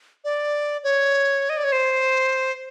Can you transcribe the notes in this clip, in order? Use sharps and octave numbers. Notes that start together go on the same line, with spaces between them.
D5
C#5
D#5
D5
C#5
C5